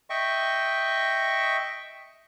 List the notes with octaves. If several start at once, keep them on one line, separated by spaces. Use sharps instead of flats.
D#5 E5 G5 C#6